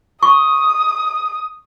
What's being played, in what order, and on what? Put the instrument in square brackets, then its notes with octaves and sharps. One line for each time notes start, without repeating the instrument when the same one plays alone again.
[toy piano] C#6 [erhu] D#6